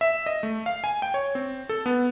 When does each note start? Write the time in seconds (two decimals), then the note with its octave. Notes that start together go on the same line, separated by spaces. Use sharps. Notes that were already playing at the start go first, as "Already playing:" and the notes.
0.01 E5
0.26 D#5
0.43 A3
0.66 F5
0.84 G#5
1.02 G5
1.14 C#5
1.35 C4
1.69 A4
1.86 B3